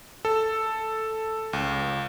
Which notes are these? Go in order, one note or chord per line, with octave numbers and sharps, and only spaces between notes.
A4
C#2